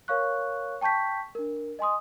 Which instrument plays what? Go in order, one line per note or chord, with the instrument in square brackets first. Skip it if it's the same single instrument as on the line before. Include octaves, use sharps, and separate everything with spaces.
[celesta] A#4 C#5 F5 C#6 F#6
G5 A5 C#6 G6 B6
D4 A#4
D#5 G#5 C6 D#6